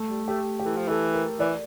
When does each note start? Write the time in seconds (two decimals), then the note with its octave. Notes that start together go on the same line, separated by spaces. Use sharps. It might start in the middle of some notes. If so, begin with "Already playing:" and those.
Already playing: A3
0.09 G3
0.27 A3 G4
0.59 G4
0.65 E3 A4
0.77 F3
0.88 E3 A4
1.14 A#4
1.40 E3 D5